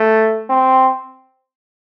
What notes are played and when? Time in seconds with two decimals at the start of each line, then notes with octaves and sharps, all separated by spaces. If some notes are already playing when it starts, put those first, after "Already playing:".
Already playing: A3
0.49 C4